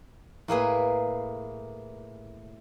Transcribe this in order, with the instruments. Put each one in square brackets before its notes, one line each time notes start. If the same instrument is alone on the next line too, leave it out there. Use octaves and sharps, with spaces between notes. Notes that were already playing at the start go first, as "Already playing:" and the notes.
[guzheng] A2 A#3 G#4 B4